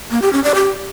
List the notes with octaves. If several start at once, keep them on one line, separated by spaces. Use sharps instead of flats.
A#3
G4
C#4
D5
G4